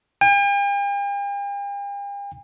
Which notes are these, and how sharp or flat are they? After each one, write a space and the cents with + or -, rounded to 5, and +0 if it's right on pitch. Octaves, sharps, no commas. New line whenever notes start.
G5 +45